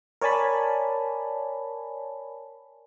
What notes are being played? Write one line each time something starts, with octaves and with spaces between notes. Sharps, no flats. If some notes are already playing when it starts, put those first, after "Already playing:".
A#4 C#5 D5 G#5 A5 B5